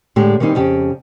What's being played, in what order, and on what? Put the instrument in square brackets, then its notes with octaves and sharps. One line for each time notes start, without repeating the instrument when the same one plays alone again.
[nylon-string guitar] A2 D3 G#3 A3 G4
D#3 E3 G3 C4 D#4
F2 C#3 G4